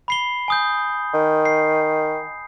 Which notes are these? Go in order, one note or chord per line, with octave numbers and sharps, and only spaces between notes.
B5 C7 G7
G#5 D#6 G6
D#3
C7